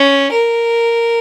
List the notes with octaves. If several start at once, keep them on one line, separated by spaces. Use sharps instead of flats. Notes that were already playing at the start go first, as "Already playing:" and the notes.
Already playing: C#4
A#4